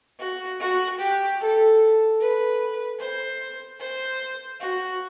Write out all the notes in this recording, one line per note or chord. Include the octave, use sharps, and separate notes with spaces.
F#4
F#4
G4
A4
B4
C5
C5
F#4